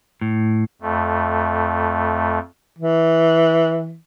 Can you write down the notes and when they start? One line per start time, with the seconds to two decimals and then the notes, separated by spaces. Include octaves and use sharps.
0.21 A2
0.82 F2 A3
2.79 E3